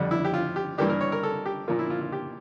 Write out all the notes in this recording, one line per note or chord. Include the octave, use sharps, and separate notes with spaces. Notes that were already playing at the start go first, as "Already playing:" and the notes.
Already playing: F2 D3 G3 D4
E4
G4
F4
G4
G2 E3 A#3 D4 G4
A#4
C#5
A#4
A4
G4
A#2 F3 A#3 F4
E4
F4
F4
G4